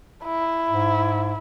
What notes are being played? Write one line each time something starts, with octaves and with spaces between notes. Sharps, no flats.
E4
G#2